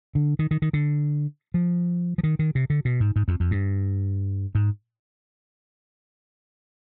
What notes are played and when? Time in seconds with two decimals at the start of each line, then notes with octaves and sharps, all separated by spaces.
0.15 D3
0.39 D#3
0.51 D#3
0.62 D#3
0.73 D3
1.54 F3
2.18 F3
2.23 D#3
2.39 D#3
2.55 C3
2.70 D3
2.85 B2
3.00 G#2
3.16 G#2
3.28 F2
3.40 F2
3.51 G2
4.55 G#2